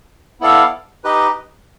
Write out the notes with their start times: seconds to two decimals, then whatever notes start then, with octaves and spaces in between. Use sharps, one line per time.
0.41 B3 E4 A4 D5 F5
1.04 D#4 G4 B4 D#5